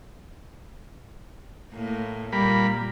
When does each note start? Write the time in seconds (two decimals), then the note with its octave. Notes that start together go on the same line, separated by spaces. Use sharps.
1.73 A2 A#3
2.32 A#2 G3 A#3 B5